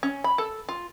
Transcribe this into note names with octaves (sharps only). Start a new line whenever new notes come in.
C#4
B5
A4
F4